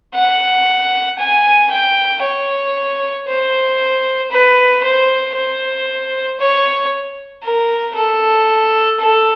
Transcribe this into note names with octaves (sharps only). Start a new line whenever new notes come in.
F#5
G#5
G5
C#5
C5
B4
C5
C5
C#5
A#4
A4
A4